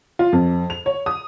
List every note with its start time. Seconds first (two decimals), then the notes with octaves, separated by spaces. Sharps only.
0.19 F4
0.33 F2
0.70 F7
0.86 C#5
1.06 D#6